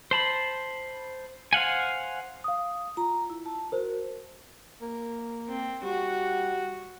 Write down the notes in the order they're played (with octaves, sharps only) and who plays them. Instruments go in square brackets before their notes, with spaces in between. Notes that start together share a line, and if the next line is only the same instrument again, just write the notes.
[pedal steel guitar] C5 A5 B5
C5 F5 F#5 G#5
[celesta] F5 D#6
[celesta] F4 [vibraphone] A#5
[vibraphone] E4
A5
[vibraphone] F#4 [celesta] A#4 C5
[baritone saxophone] A#3
[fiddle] C4
[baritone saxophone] G3 [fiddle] F#4